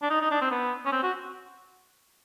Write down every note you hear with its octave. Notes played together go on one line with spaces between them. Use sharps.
D4
D#4
D#4
D4
C4
B3
C#4
C4
F#4